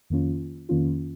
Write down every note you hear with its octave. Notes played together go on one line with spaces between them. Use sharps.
F2 D#3 A#3 C#4 F4
F2 D#3 A#3 C#4 F4